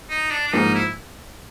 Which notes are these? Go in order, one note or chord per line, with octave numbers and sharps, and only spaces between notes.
D#4
D4
D4
G#2 F3 A#3 D#4
E4